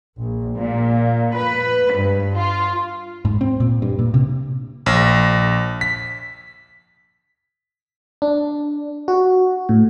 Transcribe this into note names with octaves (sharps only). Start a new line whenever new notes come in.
A#1
A#2
B4
G2
F4
G#2
C4
A#2
G2
A#2
C3
A#1
B6
D4
F#4
A2